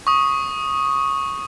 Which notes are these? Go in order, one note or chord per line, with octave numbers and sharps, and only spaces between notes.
C#6 D#6